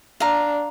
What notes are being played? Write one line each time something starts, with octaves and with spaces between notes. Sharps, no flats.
D4 F5 A#5